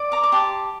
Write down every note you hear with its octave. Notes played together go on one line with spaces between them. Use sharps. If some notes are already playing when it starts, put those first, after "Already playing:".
Already playing: D5
A#5 D6
D6
G4 A5 C6